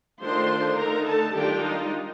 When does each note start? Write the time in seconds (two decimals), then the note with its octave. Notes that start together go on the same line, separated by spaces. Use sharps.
0.22 D#3 A3 D4 F4 C5 C6
0.79 D3 A3 D#4 A#4 A#5
1.07 A4 A5
1.35 D#3 G3 D4 F4 G4 G5
1.63 D#4 D#5